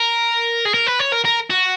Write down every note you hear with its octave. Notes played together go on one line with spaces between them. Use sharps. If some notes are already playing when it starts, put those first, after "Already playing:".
Already playing: A#4
G#4
A#4
B4
C#5
A#4
A#4
F#4